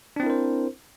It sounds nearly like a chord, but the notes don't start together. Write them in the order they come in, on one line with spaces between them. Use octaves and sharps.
D4 C4 E4 A#4 C5